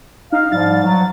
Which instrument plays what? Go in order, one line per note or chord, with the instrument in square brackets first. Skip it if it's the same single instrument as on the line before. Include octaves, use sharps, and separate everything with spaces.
[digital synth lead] D#4 [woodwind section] F5
[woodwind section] G#2 F3 G3 [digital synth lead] A6
[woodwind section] F#3